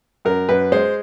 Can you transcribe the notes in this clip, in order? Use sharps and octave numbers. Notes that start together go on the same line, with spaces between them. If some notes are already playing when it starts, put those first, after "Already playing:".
F#2 A#4
F#2 B4
G#3 C5